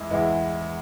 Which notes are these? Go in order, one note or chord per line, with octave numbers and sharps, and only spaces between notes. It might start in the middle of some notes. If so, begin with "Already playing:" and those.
Already playing: E2 E3 G#3 E4
E2 E3 G#3 E4